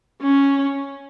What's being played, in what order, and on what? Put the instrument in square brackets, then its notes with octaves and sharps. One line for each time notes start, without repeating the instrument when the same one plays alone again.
[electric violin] C#4